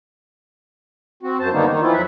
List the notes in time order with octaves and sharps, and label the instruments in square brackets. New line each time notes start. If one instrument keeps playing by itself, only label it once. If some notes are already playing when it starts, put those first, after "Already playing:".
[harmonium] C4 F#4
F#2 C5 A5
D3 D#3 G3 A#3 B3 D#4
D#3 D#4
E3 F3 E4 F4
F2 F#3 E5 F#5